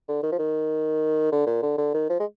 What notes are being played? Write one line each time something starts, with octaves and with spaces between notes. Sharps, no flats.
D3
D#3
F3
D#3
D3
A#2
D3
D3
D#3
F3
G#3